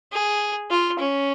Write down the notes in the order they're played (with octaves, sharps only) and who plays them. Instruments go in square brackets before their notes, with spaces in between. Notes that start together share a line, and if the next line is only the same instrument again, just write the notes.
[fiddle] G#4
F4
C#4